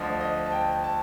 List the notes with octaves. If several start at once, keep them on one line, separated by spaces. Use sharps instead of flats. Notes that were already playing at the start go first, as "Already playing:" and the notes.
Already playing: D2 D3 F3 D#5
D#5
A5
G5
A5